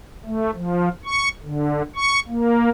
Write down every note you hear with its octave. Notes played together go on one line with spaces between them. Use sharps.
A3
F3
C#6
D3
C#6
A#3